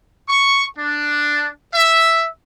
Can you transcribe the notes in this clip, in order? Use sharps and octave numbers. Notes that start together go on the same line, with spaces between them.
C#6
D4
E5